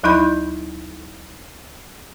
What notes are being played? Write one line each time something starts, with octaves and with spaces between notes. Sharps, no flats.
D2 F#3 D#4 E4 B5 G6